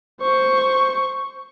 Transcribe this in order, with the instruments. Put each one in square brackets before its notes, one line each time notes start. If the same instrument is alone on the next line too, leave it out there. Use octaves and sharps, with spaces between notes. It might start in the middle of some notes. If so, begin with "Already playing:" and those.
[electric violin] C5 C#6